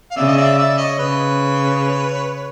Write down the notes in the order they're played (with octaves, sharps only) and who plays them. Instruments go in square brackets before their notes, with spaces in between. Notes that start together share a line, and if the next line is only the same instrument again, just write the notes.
[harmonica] F5
[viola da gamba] C#3 [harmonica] D5 E5
[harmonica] D#5
D5 E5
D5 E5
C#5 D#5
[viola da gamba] C#3 [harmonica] B4 C#5